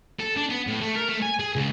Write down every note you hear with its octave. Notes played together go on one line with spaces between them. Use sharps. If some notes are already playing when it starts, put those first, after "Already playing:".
A4
D4
B3
A2
A3
A#4
A3
G#5
G#4
C#2